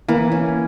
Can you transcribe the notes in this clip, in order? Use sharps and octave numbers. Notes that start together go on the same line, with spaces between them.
E3 A#3
C#4